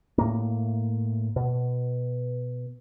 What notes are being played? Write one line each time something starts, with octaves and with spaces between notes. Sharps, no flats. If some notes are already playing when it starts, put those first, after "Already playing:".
A2 A#3
B2